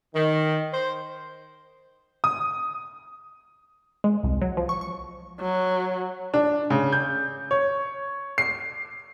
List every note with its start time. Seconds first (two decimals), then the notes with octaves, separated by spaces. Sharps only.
0.14 D#3
0.73 C5
2.24 D#6
4.04 G#3
4.23 C2
4.42 F#3
4.57 F3
4.69 C#6
4.81 C#6
5.40 F#3
6.34 D4
6.70 C#3
6.92 G6
7.51 C#5
8.38 C7